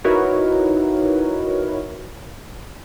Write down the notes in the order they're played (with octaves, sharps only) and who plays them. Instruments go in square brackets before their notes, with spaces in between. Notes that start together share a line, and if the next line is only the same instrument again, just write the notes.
[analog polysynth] D#4 E4 F#4 A#4 B4 C#5